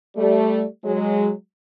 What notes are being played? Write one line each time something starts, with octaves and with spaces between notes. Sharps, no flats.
G3 A3
F#3 G#3